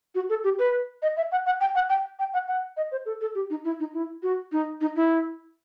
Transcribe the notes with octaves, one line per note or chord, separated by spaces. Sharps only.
F#4
A4
G4
B4
D#5
E5
F#5
F#5
G5
F#5
G5
G5
F#5
F#5
D#5
C5
A4
A4
G4
D#4
E4
D#4
E4
F#4
D#4
D#4
E4